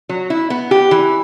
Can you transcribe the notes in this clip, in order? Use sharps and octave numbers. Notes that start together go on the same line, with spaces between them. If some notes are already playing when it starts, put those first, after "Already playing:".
F#3
E4
B3
G4
E3